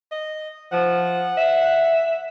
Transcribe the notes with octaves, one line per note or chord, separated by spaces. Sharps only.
D#5
F3 F#5
E5